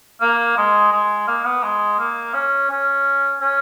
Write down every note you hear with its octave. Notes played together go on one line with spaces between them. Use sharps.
A#3
G#3
G#3
A#3
B3
G#3
A#3
C#4
C#4
C#4